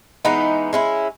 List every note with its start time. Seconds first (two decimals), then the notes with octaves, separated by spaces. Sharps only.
0.25 E3 G#3 B3 D#4
0.73 G#3 C#4 E4